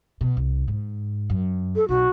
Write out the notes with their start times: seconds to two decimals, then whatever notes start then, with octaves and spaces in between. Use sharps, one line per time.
0.21 B2
0.37 C2
0.68 G#2
1.30 F#2
1.76 A4
1.89 B1 F#4